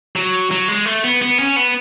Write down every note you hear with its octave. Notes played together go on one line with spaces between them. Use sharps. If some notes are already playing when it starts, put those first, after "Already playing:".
F#3
F#3
G#3
A3
B3
B3
C#4
B3